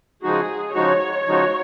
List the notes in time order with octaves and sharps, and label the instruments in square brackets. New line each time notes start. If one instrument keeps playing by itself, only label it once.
[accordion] C#3 F3 G#3 D#4 F#4 [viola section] G#4
[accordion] C#3 F3 G#3 D#4 F#4 [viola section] C#5
[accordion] C#3 F3 G#3 D#4 F#4